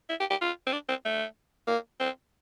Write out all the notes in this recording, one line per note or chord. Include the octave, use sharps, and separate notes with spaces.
E4
G4
G4
F4
C4
D4
C4
A3
A#3
C4